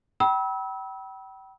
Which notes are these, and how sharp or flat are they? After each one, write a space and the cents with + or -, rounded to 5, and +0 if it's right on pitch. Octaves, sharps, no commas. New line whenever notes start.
G5 -35 B5 -30 E6 -30